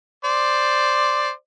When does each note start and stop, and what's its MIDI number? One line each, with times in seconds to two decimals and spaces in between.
0.25 1.31 72
0.25 1.31 74